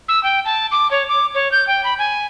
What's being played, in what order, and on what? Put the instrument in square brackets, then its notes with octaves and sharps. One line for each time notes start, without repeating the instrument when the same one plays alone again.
[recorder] E6
G5
A5
D6
C#5
D6
C#5
G6
G5
B5
G#5